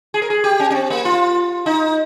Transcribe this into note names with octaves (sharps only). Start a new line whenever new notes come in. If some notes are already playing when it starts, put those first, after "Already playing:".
G#4
A#4
G#4
G4
C#4
C#4
C4
A#3
F4
D#4